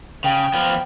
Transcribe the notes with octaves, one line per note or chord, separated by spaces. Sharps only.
C#3 G5
F3 B3